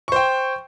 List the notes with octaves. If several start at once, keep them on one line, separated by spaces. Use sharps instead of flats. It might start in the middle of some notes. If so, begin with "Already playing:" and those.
C5 G5 C#6